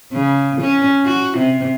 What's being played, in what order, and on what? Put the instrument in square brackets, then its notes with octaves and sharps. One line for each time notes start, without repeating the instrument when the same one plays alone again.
[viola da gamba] C#3
C#4
F#4
C3